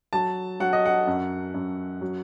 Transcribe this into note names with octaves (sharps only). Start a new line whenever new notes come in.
F#3 A5
F#3 F#5
D#5
F#5
F#2
F#2
F#3